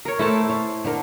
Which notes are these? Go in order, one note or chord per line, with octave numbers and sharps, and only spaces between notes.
A#4 C#5
A3 E4 C5 A5
C#5
D3 D4 A#4